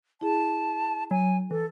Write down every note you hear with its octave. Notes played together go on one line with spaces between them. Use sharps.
E4 G#4 A5
F#3 G#5
E3 A4